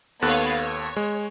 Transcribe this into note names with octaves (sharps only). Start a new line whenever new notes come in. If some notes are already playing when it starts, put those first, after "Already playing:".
D#2 B3 A4 C#5 F5 F#6
C#5
G#3